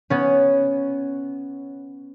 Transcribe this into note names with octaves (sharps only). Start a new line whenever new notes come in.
B3 C#4